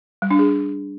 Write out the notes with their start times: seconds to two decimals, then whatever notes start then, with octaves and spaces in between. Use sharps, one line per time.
0.22 G3
0.31 D4
0.39 G#4